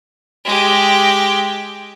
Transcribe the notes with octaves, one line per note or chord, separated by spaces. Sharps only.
G#3 G4